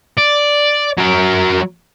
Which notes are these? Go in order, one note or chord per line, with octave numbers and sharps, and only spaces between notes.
D5
F#3 A#4